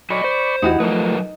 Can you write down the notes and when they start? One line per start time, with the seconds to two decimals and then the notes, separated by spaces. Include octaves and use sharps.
0.10 F#3 D5 D#5 B5 C#6
0.24 C5
0.62 E2 D#4 E4 F#4 G4
0.80 F3 F#3 A3 D#4 A#4 B4